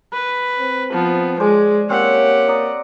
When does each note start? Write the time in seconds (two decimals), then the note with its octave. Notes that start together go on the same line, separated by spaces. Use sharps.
0.13 B4
0.60 C4
0.92 F3 B3
1.40 G#3 G#4 C5 D5 G#5
1.90 A#3 C4 C#4 G4 F#5 C#6
2.48 D5 A#5 D#6